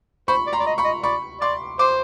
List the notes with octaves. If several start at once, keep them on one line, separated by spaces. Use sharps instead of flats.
C5 B5 C#6
D5
A#5 C6
D5
D#5
B5 C#6
D#5
D5 B5 C#6
D5 C6 D6
C5 C6 D6